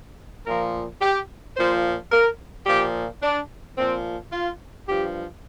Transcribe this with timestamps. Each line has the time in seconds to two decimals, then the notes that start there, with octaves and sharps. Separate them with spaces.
0.45 A#2 F3 A#4
1.01 G4
1.56 A#2 F3 C5
2.11 A#4
2.66 A#2 F3 G4
3.21 D4
3.77 A#2 F3 C4
4.31 F4
4.87 G2 F3 G4